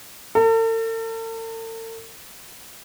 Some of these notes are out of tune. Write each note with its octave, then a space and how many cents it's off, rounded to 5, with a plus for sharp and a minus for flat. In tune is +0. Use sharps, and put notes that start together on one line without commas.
A4 +45